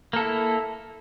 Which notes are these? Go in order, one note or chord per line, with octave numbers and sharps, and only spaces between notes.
A#3 E4 A4